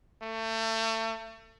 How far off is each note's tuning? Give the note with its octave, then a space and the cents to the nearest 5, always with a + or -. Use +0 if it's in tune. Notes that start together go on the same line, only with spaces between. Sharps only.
A3 +30